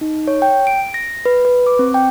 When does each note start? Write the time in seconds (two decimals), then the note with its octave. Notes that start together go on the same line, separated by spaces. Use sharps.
0.01 D#4
0.28 C#5
0.42 G5
0.67 D7
0.94 A#6
1.26 B4
1.45 B4
1.67 D6
1.79 C4
1.94 G5